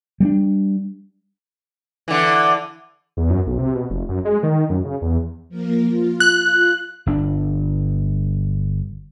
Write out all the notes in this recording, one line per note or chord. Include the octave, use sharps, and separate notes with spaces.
G3 A#3 D4
D3 E3
E2
F#2
B1
C3
B2
F1
F#2
G#3
D#3
F#2
C#3
E2
F3 A#3 A#4
F4
F#6
G1 D4